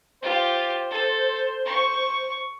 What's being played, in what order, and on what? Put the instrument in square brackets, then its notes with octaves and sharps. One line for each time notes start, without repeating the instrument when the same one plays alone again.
[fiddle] F4 G4 [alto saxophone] C5
[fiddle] A4
C#6